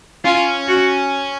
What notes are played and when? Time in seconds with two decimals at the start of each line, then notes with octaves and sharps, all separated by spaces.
0.25 C#4 F4
0.68 F#4